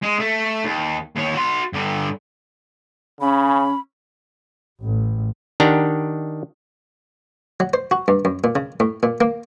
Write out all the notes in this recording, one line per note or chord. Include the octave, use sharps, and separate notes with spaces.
G#3
A3
D#2
D#2 C#5
F#4 C6
G2 D3
C#3 C#4 B5
A1
D#3 D4 G4 F#5 A#5
F#3
C5
F#4
G2
F#2
A#2
C#3
A2
A#2
A#3